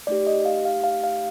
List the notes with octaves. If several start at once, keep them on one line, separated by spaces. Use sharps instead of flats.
A3 D#4 G4 D5
D#5
F5
F5
F5
F5